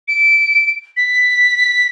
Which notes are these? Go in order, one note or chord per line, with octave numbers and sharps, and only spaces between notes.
D7
B6